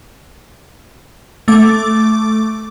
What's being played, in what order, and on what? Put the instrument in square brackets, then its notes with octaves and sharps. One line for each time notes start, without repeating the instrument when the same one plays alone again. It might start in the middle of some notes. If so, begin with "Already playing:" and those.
[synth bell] A3 D6